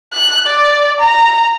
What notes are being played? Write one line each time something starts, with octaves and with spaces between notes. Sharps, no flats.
F#6
D5
A#5